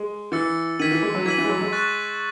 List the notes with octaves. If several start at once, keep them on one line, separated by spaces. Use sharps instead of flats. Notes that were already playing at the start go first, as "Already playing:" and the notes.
Already playing: G#3
E3 E6 A6 C#7
D#3 G#6 B6 D#7 F#7
E3
G#3
F#3
E3 G#6 B6 D#7 F#7
E3
G#3
F#3
G#3
C#6 F#6 A6